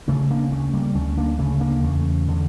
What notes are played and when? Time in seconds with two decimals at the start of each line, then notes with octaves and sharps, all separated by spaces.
0.08 C#3 A3 C#4
0.31 A#3 D4
0.52 D2 A3 C#4
0.74 G3 A#3
0.95 D2 A3 C#4
1.17 A#3 D4
1.39 C#3 A3 C#4
1.61 A#3 D4
1.83 E2 A3 C#4
2.28 D3